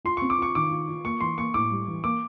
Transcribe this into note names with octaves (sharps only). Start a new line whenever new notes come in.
F4 C6
C#6
C4
D6
F4 C#6
D#3 D6
F4
F4
A#3 C#6
E3 C6
A#3 C#6
A2 D6
G3
E3
A#3 D6